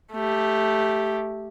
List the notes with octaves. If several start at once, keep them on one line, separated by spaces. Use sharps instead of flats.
A3 G4